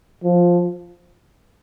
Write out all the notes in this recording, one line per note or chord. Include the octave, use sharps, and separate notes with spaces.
F3